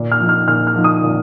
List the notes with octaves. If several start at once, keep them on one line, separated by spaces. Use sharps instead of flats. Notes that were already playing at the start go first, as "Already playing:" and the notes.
Already playing: A#2
F6
F3 D#4
F6
A#2 F6
F6
F3 D#4
D#6
A#2